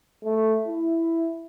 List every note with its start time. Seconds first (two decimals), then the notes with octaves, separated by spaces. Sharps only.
0.24 A3
0.68 E4